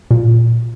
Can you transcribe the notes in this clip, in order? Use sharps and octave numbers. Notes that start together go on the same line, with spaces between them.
A#2